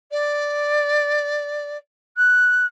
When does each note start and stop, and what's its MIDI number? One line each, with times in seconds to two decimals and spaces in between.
0.11 1.77 74
2.17 2.66 90